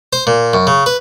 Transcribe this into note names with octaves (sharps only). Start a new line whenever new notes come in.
C5
A#2
F#2
C#3
B4